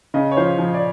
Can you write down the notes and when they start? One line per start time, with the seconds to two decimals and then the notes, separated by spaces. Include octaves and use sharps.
0.14 C#3 D#5
0.31 C#5
0.37 F3 C5
0.58 F3
0.74 D5